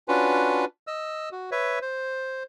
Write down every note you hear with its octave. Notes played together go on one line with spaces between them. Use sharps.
C#4 D4 F4 F#4 B4
D#5 E6
F#4
B4 C#5 E5
C5